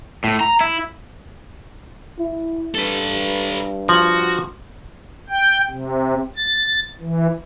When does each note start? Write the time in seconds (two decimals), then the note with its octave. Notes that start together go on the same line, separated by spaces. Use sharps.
0.24 A2
0.41 A#5
0.61 E4
2.19 E4
2.75 G2 A4 B4
3.89 F3 F#4
5.30 G5
5.70 C3
6.36 A6
7.01 E3